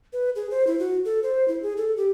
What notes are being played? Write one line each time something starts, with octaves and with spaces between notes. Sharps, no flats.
B4
G#4
C5
E4
F#4
A4
C5
E4
G#4
A4
G4